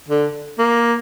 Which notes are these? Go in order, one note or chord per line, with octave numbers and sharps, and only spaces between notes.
D3
A#3